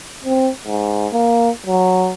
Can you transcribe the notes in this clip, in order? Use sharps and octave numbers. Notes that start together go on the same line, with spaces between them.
C4
G#2
A#3
F#3